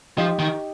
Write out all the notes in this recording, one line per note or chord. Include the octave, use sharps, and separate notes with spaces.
F3 D#4 G4
D#3